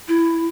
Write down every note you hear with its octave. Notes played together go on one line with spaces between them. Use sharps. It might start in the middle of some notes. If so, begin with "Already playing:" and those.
E4